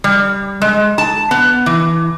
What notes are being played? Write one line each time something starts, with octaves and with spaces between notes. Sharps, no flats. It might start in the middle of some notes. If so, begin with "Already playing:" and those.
G3
G#3
A5
B3
E3